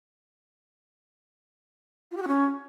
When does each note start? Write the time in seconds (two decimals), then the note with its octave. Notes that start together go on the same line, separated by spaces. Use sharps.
2.11 F4
2.17 G4
2.22 F#4
2.28 C#4